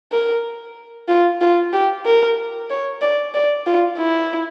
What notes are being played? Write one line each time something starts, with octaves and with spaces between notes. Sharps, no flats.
A#4
F4
F4
G4
A#4
C#5
D5
D5
F4
E4